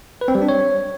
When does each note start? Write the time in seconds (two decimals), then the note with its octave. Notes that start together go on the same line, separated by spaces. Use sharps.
0.21 B4
0.28 C4
0.35 G3
0.42 D4
0.49 C#5